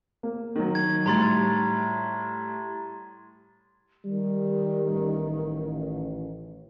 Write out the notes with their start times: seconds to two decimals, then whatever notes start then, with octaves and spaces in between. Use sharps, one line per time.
0.23 A#3
0.56 D#3 F#3
0.75 G#6
1.06 A2 G3 A#5 C6 A6
4.05 D#3 G3
4.89 A1